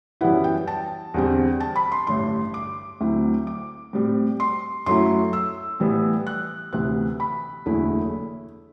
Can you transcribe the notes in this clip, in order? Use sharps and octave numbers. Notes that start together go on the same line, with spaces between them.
F#2 E3 G3 B3 E4 F#5
G5
A5
E2 D3 G3 C4
A5
B5
C6
A1 G2 D3 C6
D6
D2 D3 F#3 C4 E4
D6
A2 G3 C4
C6
F#2 F#3 A3 E4 C6
E6
A2 E3 G3 B3
F#6
D2 C3 E3 B3 F#6
B5
F#1 E2 D3 A3 E4